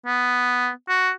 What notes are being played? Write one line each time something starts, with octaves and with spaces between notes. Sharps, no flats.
B3
F#4